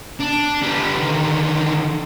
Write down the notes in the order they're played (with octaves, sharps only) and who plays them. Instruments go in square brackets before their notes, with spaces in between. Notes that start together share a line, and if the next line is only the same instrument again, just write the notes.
[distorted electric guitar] D4
G3 B3
D3 D#3